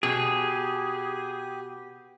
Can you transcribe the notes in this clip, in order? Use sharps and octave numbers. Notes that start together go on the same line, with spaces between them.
B2 G4 G#4